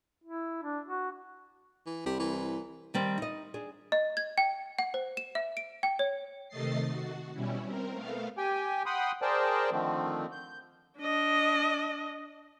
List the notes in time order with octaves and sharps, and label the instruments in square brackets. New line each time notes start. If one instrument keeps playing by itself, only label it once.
[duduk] E4
D4
F#4
[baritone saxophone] E3
[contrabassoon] C2 [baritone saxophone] G3
[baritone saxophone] E3
[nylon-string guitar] D#3 G3 C4
D#4 D#5
D4 G#4
[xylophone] D#5
G#6
G5
F#5
C5
E7
E5
D7
G5
C#5
[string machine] C3 D#3 A3 D#5 A6 C7
F#4
B2 G3 C#4 E4
C4 A#4
A3 B3 F5
[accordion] G4 G5 G#5
F#5 G5 B5 C6 D#6
G#4 A#4 C5 D5 G5 A5
D3 D#3 F3 A3 C4
G6
[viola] D4 D#5